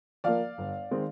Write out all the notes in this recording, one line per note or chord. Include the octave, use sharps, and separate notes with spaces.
F3 A#3 D5 F5
G1
D#3 G#3 C4